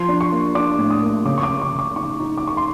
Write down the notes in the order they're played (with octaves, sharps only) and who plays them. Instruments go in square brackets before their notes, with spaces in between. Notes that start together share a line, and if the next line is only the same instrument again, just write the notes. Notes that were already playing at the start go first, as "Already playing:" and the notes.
Already playing: [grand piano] F3 C6
D4
C#6
A#3
D4 D6
A2
D#6
A#3
C#3 D6
C#6
D6
C#3
C#6
C#3
D6
D#4 C#6
D#4
D6
D#4 C#6
C6